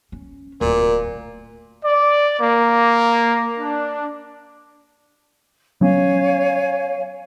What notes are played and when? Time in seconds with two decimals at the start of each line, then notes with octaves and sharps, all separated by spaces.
0.12 C#4
0.61 D1 A#2
1.83 D5
2.40 A#3
3.59 D4
5.81 F#3 B3 C#4 C#5 F5 G#5